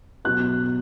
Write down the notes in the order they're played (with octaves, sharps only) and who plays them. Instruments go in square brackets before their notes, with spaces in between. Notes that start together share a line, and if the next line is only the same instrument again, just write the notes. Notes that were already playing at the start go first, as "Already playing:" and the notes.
[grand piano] B2 F#3 B3 F#6